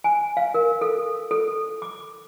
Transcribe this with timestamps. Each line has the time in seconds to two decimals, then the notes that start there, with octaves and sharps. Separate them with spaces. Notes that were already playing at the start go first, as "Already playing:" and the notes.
0.04 G#5
0.37 F5
0.54 A#4
0.81 A4
1.31 A4
1.82 D6